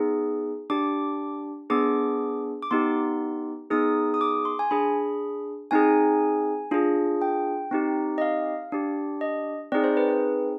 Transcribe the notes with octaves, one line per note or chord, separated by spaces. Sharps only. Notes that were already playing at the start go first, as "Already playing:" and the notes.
Already playing: B3 D#4 G#4
D4 G4 D6
B3 D4 G#4 D6
D6
B3 D#4 G4 C6
B3 D#4 G#4 D#6
D#6
D6
C6
G#5
D4 G#4 B5
C4 D#4 G#4 G#5
D4 F4 G#4
G5
C4 D#4 G4
D#5
F5
D4 G4
D#5
C4 D#4 G#4 D5
C5
B4
B4